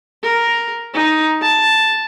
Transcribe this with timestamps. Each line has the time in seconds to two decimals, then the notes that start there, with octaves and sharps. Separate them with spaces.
0.23 A#4
0.94 D#4
1.42 A5